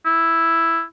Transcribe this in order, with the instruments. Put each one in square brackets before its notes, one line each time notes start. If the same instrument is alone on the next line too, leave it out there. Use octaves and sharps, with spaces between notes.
[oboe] E4